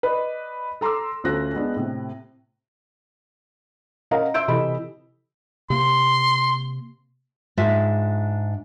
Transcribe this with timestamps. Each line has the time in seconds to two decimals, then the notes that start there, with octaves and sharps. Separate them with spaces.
0.03 B4 D5 D#5
0.81 A4 A#5 C6 D6 E6
1.24 D2 A3 C#4 F4 F#6 A#6
1.54 G#3 B3 D4
1.76 A2 C3
4.11 C#4 A#4 D#5 F5 F#5 A#5
4.34 E5 C6 E6 G6 D7
4.48 C3 E3 A4 D#5 B5
5.70 C3 A#3 C6
7.57 G#2 D4 F4 E5